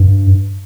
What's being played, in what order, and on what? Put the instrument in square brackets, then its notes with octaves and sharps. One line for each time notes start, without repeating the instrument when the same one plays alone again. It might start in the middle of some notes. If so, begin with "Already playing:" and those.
Already playing: [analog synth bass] G2